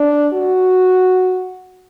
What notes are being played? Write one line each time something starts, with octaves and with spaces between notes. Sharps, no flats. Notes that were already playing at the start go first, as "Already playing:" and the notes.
Already playing: D4
F#4